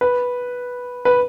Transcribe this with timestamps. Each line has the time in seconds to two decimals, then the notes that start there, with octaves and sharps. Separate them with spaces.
0.01 B4
1.05 B4